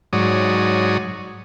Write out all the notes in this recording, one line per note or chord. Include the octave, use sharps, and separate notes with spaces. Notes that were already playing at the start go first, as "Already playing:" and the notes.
G#2 F#3 C#5 D5 D#6